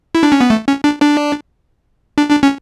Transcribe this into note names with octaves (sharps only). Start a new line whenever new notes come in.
E4
D4
C#4
B3
A3
C#4
D4
D4
D4
D4
C#4